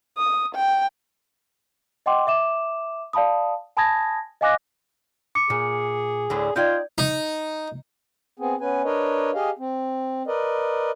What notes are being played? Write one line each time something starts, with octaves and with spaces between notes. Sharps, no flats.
D#6
G5
D#5 F#5 G5 C6 D6
E5 D6 E7
D5 F5 A5 B5 D#6
G#5 A5 B5 D#6 G#6 A#6
D#5 F5 G#5 D6 F#6 A#6
D6 C#7
A#2 G#4
D2 A2 D3
D#4 F4 D5 G5 G6 G#6
D#4
B3 C4 G#4
B3 C#4 B4 G#5
D4 A#4 B4 C#5 D#5
G4 G#4 D#5 F5
C4
A#4 B4 D5 D#5